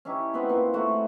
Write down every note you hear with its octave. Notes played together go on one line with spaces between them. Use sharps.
C#4 D#4 E4 G4
B3 C4 F#4 B4
A#2
A3 D#4 E4 F#4